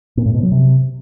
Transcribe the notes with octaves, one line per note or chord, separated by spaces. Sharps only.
A#2
A2
B2
F#3
C3